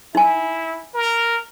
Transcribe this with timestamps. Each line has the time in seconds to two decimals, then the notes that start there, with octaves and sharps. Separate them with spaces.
0.15 D#4 E4 G#5
0.94 A#4